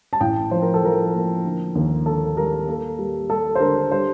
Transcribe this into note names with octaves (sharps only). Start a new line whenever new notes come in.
A5
A1 G5
F3 C5
A#4
A4
F3 A#4
A#3
D3
D#2
D3 A4
G3 A#4
A#3 A4
G3
G3 A4
C5
D3 A#4
G3 C5